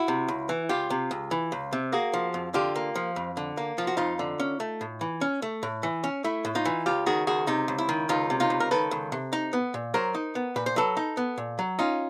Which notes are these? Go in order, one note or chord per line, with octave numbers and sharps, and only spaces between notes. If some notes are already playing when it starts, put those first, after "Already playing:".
Already playing: E4 F#4
C3
C#2
E3
C#2 F4 G4
C3
C#2
E3
C#2
C3
A#3 F#4 G#4
F3
F2
D3 F4 G4
A#3
F3
F2
D3
A#3
F3 F4
F#4
F2 D#4 F4
D3
C#4
A3
A2
E3
C#4
A3
A2
E3
C#4
A3 E4
A2
D#4 F4
E3
C#2 F4 G4
D#3 F#4 G#4
C#2 F#4 G#4
C3 D#4
C#2
E4
D#3
C#2 D#4 F4
C3
D#4 F4
C#2
A#4
D#3 A4 B4
C#2
C3
D#4
B3
A#2
F#3 A#4 C5
D#4
B3
A#2 B4
C5
F#3 A4 B4
D#4
B3
A#2
F#3
C#4 D#4 F4